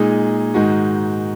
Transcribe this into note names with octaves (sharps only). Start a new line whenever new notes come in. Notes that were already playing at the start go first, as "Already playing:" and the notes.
Already playing: A#2 G#3 D#4 G#4
G#2 D#3 G#3 F#4